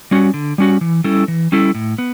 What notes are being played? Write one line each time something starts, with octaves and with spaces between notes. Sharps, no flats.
G3 C#4 F#4
D3
G3 C#4 F#4
E3
G3 C#4 E4 A4
E3
G3 C#4 E4 A4
A2
B3